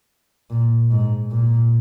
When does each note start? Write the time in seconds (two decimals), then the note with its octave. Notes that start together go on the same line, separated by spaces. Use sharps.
0.50 A#2
0.91 G#2
1.31 A#2